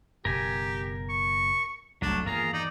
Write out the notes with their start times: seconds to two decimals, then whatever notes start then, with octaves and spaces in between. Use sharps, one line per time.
0.25 F#1 B2 B3 G4 A#4 G#5
1.09 C#6
2.02 F1 C2 F#3 A3 D4
2.26 E2 G2 D#3 A#3 F4 G#4 A#5
2.53 D#4 D5